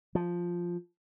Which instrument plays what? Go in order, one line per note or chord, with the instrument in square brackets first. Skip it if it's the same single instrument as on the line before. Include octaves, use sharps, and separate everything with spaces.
[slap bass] F3